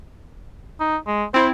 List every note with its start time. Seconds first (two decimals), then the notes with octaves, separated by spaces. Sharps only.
0.80 D#4
1.07 G#3
1.34 C4 E4 C5